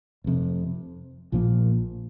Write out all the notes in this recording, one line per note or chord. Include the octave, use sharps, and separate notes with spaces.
F1 F2 C3
A#1 A#2 F3 A#3